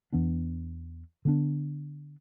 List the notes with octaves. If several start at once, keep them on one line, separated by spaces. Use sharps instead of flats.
E2 E3 B3 D4
D3 B3 D4